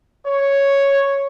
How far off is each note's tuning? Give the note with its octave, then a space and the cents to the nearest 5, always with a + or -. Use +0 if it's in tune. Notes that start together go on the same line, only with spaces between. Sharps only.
C#5 +0